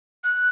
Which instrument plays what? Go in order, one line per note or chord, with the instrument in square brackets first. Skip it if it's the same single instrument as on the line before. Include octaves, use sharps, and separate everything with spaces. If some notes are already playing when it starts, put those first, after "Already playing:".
[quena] F#6